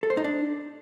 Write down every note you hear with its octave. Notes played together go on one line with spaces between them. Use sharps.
A4
C5
D#4
D4